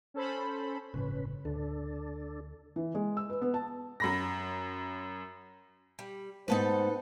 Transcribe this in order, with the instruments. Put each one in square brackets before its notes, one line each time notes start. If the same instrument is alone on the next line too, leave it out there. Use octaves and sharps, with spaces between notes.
[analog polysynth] C#4 A4 C5 B5
[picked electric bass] G1 A2 C#3 [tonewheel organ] C#4 B4
[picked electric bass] D2 [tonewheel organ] D4 A4
[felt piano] E3
G#3
E6
B4
B3
A5
[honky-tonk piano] F#2 B5 A#6
[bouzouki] G3
[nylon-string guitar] G#2 B3 C4 [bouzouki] D#4 A4 B4 [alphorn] C5